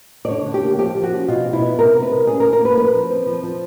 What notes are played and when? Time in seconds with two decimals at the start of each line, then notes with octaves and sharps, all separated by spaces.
0.25 D5
0.28 D3 C#5
0.46 D3
0.54 G4
0.62 A#3
0.78 F3 G4
0.95 F3
1.03 F#4
1.12 C#4
1.28 B2 F4
1.45 B2
1.53 E4
1.62 B3
1.79 C3 A#4
1.95 C3
2.03 B4
2.11 G#3
2.27 C#4 G#4
2.40 A#4
2.44 C#3
2.53 A#4
2.61 A#3 B4
2.77 F3 B4
2.94 F3
3.10 C4
3.26 F3
3.43 F3